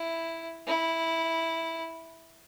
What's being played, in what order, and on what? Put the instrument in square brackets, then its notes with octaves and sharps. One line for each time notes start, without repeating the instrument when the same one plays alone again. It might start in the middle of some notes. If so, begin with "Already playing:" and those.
Already playing: [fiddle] E4
E4